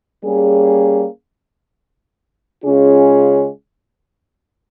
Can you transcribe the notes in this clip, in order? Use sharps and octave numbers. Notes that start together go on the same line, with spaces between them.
G3 A#3 C#4 G#4
C#3 G#3 C#4 F4 G#4